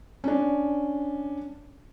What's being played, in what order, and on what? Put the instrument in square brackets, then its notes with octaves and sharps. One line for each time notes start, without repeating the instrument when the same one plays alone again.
[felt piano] C#4 D4